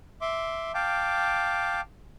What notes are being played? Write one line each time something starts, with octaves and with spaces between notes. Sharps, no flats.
E5 C6 D6
F5 G5 A5 D6